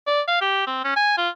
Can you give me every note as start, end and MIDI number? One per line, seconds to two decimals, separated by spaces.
0.07 0.21 74
0.28 0.37 77
0.41 0.65 67
0.67 0.80 60
0.84 0.92 61
0.96 1.15 80
1.17 1.29 65